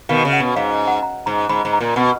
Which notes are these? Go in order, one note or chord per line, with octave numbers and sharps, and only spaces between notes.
B2 D#3 F5
C#3
F#5
B2
G#2 F5
F#5
A#5
G#2 A#5
G#2 B5
G#2
A#5
A#2
B2 F#5